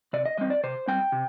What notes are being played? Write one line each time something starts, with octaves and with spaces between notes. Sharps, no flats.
C3 D5
D#5
G3 C4 D#5
D5
C3 C5
G3 C4 G5
C3